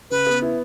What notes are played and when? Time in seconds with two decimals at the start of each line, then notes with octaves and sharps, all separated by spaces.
0.11 C#3 B4
0.27 B3
0.42 E4